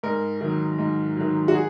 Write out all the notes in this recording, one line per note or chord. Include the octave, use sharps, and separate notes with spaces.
G#2 A#4
D#3 F#3
G#2
D#3 F#3
F#4
G#4